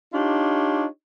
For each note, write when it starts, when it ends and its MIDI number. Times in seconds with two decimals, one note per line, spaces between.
0.13 0.86 62
0.13 0.86 63
0.13 0.86 65
0.13 0.86 67
0.13 0.86 73